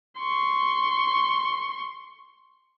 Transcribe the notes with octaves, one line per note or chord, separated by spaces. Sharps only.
C6 C#6